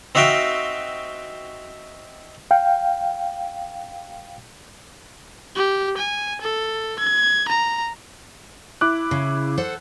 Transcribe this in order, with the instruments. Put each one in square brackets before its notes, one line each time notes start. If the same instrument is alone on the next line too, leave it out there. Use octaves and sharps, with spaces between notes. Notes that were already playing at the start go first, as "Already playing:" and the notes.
[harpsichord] C4 D#4 F#4 E5 F5 G5
[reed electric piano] F5 G5
[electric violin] G4
G#5
A4
G#6
A#5
[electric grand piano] E4 D6 F#6
[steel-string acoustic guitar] C#3
A4 C5 F#5